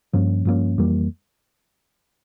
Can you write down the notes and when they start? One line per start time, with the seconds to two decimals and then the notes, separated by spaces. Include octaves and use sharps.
0.13 G2 F3 A#3 C#4
0.45 G2 F3 A#3 C#4
0.78 F2 E3 G3 A#3